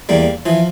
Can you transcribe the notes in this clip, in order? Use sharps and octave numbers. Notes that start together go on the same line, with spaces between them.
E2 G3 A#3
E3 F3